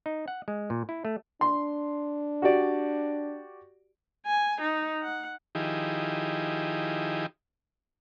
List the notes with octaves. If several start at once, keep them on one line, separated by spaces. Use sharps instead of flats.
D#4
F#5
G#3
A#2
E4
A3
D4 C6
F#4 G4 D5
G#5
D#4
F#5
D#3 F3 D#4 E4 G4 G#4